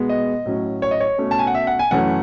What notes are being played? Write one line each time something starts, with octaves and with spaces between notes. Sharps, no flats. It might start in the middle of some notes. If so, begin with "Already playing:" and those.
Already playing: B2 G#3 B3
D#5
A2 F#3 C#4
C#5
D#5
C#5
B2 A3 C#4
A5
G#5
F#5
E5
F#5
G#5
F#2 E3 A3 C#4 F#5